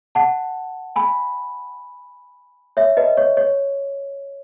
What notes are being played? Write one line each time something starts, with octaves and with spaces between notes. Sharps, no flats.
F#5 A5
G#5 B5
C#5 E5
B4 D#5
C#5
C#5